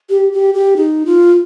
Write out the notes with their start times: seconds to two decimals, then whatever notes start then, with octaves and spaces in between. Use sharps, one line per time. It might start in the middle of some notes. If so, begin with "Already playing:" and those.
0.10 G4
0.32 G4
0.54 G4
0.77 D#4
1.06 F4